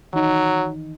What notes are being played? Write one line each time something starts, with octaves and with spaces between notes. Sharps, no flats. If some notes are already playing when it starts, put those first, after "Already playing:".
D#3 E3 F#3 D#4